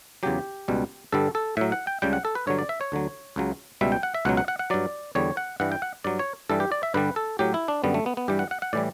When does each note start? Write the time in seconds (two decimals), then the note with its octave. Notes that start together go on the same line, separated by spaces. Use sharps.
0.23 E2 C#3 F#3 G4
0.68 C#2 B2 G3
1.12 G2 D3 G3 A4
1.35 A4
1.57 A2 F#3 E5
1.72 F#5
1.87 G5
2.02 C#2 C#3 G3 G5
2.13 F#5
2.25 A4
2.35 B4
2.47 G2 D3 F#3 C#5
2.59 D5
2.69 E5
2.81 C#5
2.92 D2 D3 F#3
3.36 C#2 C#3 F#3
3.81 C#2 B2 G3 E5
3.92 G5
4.03 F#5
4.14 E5
4.25 C#2 B2 F#3 F#5
4.37 F#5
4.48 F#5
4.59 F#5
4.70 G2 F#3 D5
5.15 E2 D3 G3 C#5
5.37 F#5
5.60 G2 E3 G3 F#5
5.72 G5
5.82 F#5
6.04 G2 F#3 D5
6.19 C#5
6.49 G2 E3 G3 A4
6.60 G4
6.72 D5
6.83 E5
6.94 G2 D3 G3 B4
7.16 A4
7.39 A2 F#3 G4
7.54 E4
7.68 D4
7.84 F#2 D3 G3 B3
7.94 A3
8.06 B3
8.17 B3
8.28 G2 E3 G3 G4
8.39 F#5
8.51 F#5
8.62 F#5
8.73 A2 E3 G3 D5